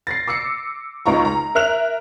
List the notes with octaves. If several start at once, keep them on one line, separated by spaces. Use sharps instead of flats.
A6 A#6 C7
D6 E6 C7 C#7
C#2 D#4 F4 A#5 C#6
A#5
A#4 E5 F6 F#6 F7